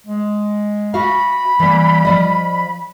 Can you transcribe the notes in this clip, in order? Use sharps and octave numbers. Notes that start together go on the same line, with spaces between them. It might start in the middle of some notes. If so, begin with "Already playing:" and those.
G#3
F#4 E5 F5 B5
E3 G3 A#3
F3 D5 D#5